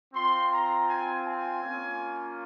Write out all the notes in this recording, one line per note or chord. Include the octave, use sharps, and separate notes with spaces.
C4 F4 C6
A#5
G#5
G#5
A#3 C#4 F4